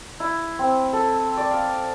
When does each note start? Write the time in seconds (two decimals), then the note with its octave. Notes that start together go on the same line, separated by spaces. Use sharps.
0.20 E4
0.59 C4
0.93 A4
1.37 D5
1.51 F5